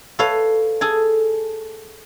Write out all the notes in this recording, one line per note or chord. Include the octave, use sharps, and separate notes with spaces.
A4 B4 C#5 F5
G#4 A4 G#5